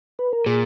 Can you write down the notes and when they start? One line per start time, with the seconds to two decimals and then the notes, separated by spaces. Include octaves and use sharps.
0.19 B4
0.33 A#4
0.46 A#2 G#4